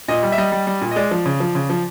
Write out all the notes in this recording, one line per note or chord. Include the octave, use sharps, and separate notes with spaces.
A#2 D#5
G3
E5
G3 D#5
G3
G3
A#2
D#5
G#3 D5
F3
C#3
F3
C#3
F3